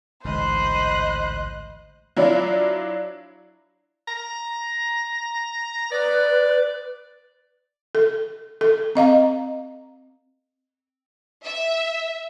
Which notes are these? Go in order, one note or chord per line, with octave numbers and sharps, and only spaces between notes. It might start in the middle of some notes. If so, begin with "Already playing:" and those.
A1 D2 G#2 C5 D#5 B5 F#6
F#3 D4 E4 F4
A#5
B4 D5
A4
A4
C4 D#5 F5 A#5
E5